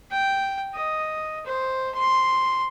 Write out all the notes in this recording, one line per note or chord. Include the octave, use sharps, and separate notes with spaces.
G5
D#5
C5
C6